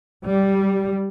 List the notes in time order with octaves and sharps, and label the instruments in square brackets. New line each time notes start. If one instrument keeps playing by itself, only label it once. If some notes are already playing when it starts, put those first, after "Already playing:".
[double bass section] G3